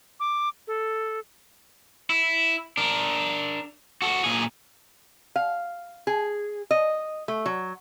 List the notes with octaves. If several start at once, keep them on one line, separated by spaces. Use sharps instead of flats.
D6
A4
E4
D4 A#4
F#4 A4
A#2 G#4
F5
G#4
D#5
A3
F#3